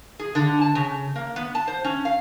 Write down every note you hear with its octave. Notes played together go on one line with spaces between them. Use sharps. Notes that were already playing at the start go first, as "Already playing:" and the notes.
G#4
D3
A5
C#3
A#3
B3
A5
C5
C#4
F5